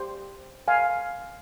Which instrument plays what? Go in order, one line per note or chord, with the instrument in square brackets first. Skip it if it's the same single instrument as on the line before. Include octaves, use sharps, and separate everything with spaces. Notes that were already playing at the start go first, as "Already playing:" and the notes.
Already playing: [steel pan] G4 C5
F5 G#5